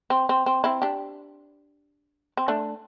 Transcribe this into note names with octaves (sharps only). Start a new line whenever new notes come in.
C4
C4
C4
C4 E4
D4 G4
C4
A3 D4